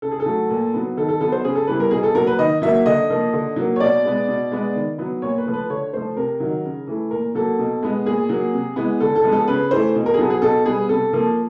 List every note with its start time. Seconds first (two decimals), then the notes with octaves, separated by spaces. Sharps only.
0.02 C#3 A4
0.11 G#4
0.20 A4
0.26 F#3 A3
0.50 A#2
0.74 F#3 B3
0.97 D#3 A4
1.09 A4
1.20 F#3 B3 A4
1.32 C5
1.44 C#3 G#4
1.55 A4
1.67 E3 G3 B3 B4
1.80 A#4
1.91 B2 G#4
2.03 A4
2.15 F#3 A#3 A#4
2.27 B4
2.39 D#3 D#5
2.62 F#3 A#3 E5
2.86 D3 D#5
3.10 F3 A#3
3.33 D3
3.56 F#3 A#3
3.76 C#5
3.80 B2 D5
4.04 G#3 B3
4.28 B2
4.52 G#3 B3
4.75 D#3
4.98 F#3 B3
5.22 A#2 C#5
5.38 B4
5.46 F3 A3
5.54 B4
5.69 D3 C#5
5.93 F3 A3 C5
6.16 C3 A#4
6.40 D#3 F#3
6.65 C#3
6.88 E3 A3
7.11 A#2 A#4
7.35 F#3 A#3 A4
7.59 B2
7.83 G#3 B3
8.06 A#2 G#4
8.29 F#3 A#3
8.53 C3
8.76 E3 G#3 B3
9.00 D3 A4
9.15 A4
9.24 F3 G#3 B3
9.32 A4
9.48 C#3 B4
9.71 E3 A3 C5
9.95 B2
10.06 A#4
10.14 G#4
10.18 F#3 A4
10.22 B3
10.30 G#4
10.42 B2 A4
10.66 G3 B3 G#4
10.89 C3 A4
11.13 F3 A#3